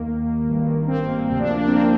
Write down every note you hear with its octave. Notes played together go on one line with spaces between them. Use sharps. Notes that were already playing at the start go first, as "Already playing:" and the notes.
Already playing: D#2 D#3 A#3
G#1 G2 D#3
C4
A#3
D2 C3 F3 C4
D4
A#3
D4
C4
A#3
C4